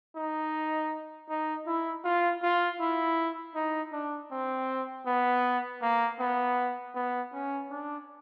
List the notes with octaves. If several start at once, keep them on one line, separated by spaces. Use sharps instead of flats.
D#4
D#4
E4
F4
F4
E4
D#4
D4
C4
B3
A#3
B3
B3
C#4
D4